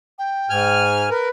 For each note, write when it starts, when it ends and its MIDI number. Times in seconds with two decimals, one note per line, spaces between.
0.19 0.84 79
0.50 1.10 44
0.50 1.10 80
0.50 1.10 89
1.10 1.29 70
1.10 1.30 71